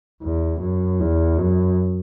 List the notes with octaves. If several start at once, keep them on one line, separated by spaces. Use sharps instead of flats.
E2
F#2
E2
F#2